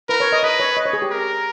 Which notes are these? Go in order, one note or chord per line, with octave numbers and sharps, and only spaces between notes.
A#4 B4
C#5
D#5
B4 D#5
C#5
D#5
C#5
G#4
G4
A#4